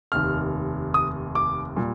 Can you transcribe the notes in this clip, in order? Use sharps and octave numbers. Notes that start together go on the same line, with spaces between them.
F1 D#2 D#3 F6
D#6
D6
A#2 G3